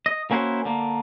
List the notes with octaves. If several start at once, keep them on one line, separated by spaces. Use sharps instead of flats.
D#5
A#3 C#4 E4 F#4 A#4 C5
D3 A#3